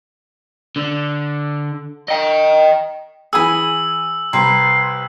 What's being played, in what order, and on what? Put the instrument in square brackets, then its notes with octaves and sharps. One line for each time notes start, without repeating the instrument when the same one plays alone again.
[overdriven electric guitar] D3
D#5 G5
[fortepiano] E3 G#5 D#6 [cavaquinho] G#4 B5 [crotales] E6
[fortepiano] C2 [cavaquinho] B4 A#5 [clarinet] C6